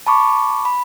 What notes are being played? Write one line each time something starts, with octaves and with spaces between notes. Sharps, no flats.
A5 B5 C#6 D6
B5